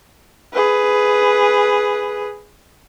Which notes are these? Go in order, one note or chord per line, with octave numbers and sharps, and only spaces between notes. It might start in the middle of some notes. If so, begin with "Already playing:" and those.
G#4 B4